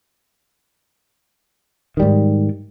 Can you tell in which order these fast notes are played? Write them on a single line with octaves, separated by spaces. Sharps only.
D#3 G3 G#2